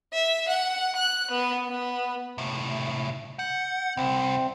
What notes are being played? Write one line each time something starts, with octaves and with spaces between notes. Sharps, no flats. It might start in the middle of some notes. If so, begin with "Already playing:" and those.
E5
F#5
F#6
B3
B3
A2 C3
F#5 G6
C2 C4